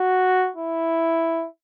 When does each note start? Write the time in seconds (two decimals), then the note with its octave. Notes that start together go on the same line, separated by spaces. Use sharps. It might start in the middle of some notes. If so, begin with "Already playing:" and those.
Already playing: F#4
0.57 E4